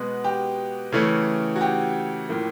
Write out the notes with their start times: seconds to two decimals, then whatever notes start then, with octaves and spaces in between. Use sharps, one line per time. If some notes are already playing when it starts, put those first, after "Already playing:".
Already playing: B2 G#3 B3 F#4
0.24 G4
0.92 C#3 E3 A3 C#4
1.56 F#4
1.61 G4
2.29 A2 F3 A#3